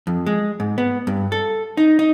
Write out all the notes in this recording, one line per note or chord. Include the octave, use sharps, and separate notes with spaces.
F2
G#3
G#2
B3
G2
A4
D#4
D#4